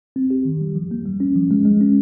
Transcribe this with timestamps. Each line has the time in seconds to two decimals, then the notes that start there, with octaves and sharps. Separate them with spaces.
0.16 C4
0.30 G4
0.45 D#3
0.61 G3
0.75 F3
0.91 A#3
1.06 G3
1.20 C#4
1.36 F3
1.51 G#3
1.65 G#3
1.81 C#4